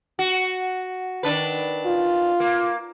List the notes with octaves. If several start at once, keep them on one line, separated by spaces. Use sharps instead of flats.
F#4
D#3 D4 B4
F4
A#3